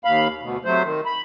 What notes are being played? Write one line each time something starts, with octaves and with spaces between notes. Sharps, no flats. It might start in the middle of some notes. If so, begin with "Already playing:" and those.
D#2 F5 B5
D2 B2
C3 F#3 A3 C5
D#3
B5